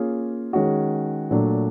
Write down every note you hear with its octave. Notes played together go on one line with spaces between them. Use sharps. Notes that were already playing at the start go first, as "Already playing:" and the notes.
Already playing: A#3 C#4 F4 G#4
D#3 G#3 C#4 F#4
A#2 F#3 A3 D4